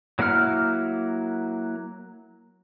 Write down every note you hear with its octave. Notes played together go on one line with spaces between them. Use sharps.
F#3 A#3 E4 F#5 F6